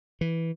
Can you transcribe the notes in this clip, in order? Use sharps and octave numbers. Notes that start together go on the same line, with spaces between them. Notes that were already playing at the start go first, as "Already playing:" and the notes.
E3